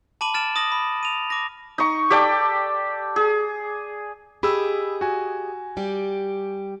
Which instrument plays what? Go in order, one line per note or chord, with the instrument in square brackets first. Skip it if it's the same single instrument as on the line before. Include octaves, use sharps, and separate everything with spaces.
[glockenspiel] A5 B5 D6 D#7 F#7
F6 A6 D7 E7
D#6 A#6 F#7
B5
D#7 F7
D6 A#6
[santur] D#4 C#6
G4 A4 D5 G5
G#4
[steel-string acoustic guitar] G4 G#4 D#5 [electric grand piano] B5 E6
[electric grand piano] F#4 G#5
[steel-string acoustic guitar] G3 G4